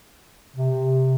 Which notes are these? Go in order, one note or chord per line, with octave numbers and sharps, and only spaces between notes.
C3